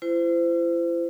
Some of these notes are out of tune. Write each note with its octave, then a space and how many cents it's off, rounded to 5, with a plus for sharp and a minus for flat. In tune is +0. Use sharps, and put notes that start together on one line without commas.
E4 +45 C5 -30